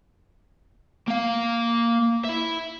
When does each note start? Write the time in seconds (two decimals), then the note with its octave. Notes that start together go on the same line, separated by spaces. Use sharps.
1.08 A#3 F5
2.25 E4 E5